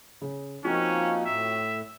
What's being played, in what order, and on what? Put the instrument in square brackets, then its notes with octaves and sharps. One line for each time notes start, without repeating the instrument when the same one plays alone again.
[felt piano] C#3
[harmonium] F3 A#3 D#4 [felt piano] C4 F4 F#4 [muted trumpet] C#4
[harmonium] A2 [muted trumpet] E5